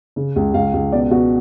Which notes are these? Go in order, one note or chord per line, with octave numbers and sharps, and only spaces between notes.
C#3
C#2
C#2 F5
C#2
B2 D5
B2 F#4